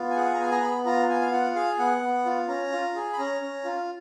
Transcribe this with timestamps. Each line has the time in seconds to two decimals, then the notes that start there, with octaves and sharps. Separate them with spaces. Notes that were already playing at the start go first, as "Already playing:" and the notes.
Already playing: B3 F4
0.10 G#5
0.16 G#4 F#5
0.34 A#5
0.39 B3 G#5
0.52 A#5
0.62 B3 B5
0.85 F4 A#5
1.09 B3 G#5
1.21 F5
1.32 F4 F#5
1.55 G#4 F5
1.79 B3 F#5
2.02 B3
2.25 F4
2.48 C#4 A#5
2.72 F4
2.95 G#4
3.13 B5
3.18 C#4 A#5
3.42 C#4
3.65 F4